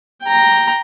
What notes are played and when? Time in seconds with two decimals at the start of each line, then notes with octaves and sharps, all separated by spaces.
0.23 G5 A#5